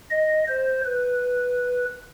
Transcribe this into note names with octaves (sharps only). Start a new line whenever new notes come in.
D#5
C5
B4